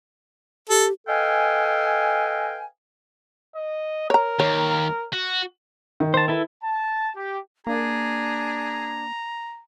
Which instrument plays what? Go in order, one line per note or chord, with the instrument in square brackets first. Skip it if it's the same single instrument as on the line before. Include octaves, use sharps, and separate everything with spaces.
[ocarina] G4 [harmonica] A4
[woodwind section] A4 B4 D#5 F5 G5 G#5
[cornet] D#5
[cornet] A#4 [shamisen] C#5 A#5
[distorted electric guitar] D#2 [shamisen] C#5
[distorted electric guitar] F#4
[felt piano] D#3
[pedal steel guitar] C5 A5
E4 A4 B4
[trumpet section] A5
G4
[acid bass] A#3 [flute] D4 [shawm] G#4 [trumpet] A#5